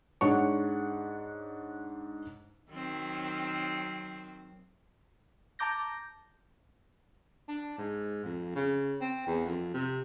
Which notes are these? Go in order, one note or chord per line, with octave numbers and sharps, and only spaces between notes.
G#2 D4 C#5 F#5 C#6
D#3 F#3 C4
A5 A#5 D6 G6 A#6
D4
G#2
F2
C#3
C4
E2
F2
C3